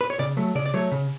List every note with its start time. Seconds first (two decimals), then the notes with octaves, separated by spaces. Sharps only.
0.01 B4
0.10 C#5
0.19 C#3 D5
0.37 F#3 A3
0.55 C#3 D5
0.66 D5
0.74 F#3 A3 C#5
0.92 C#3